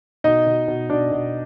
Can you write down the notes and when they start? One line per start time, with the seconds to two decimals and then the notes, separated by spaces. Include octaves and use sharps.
0.24 B2 D#4 D#5
0.46 B2
0.68 B2
0.90 B2 D4 D5
1.11 B2